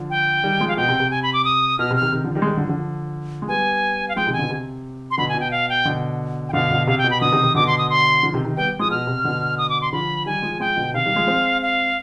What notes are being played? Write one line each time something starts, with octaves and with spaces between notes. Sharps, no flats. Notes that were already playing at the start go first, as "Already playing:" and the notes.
Already playing: D3 F3
G5
D#3 G3
F3 G#3
F5
B2 G5
C3
C3
G#5
B5
D6
D#6
B2 F6
C3
F6
C3 D#3
C3 D#3
D3 F3
D#3 G3
G#3
D#3 G3
D3 F3
D3 F3
G#3
G3 B3 G#5
F5
F3 G#3 G5
C3 D#3
G#5
B2 D3
C3
C6
B2 D3 B5
G#5
B2
G5
F5
G5
B2 D3
G5
B2 D3 F5
B2 D3
C3 F5
G5
B2
B5
B2 D3 D#6
C3 D#3
C3 D#3
B2 D3 D6
C6
D#6
C6
D3 F3
C3 D#3
C3 D#3
G3 B3 G5
F3 G#3 D#6
B2 F6
C3
B2 D3
D#6
D6
C6
D3 F3 B5
D#3 G3 G#5
F3 G#3
F3 G#3 G5
B2 D3
C3 D#3 F5
D#3 G3
F3 G#3
G#3 C4
F5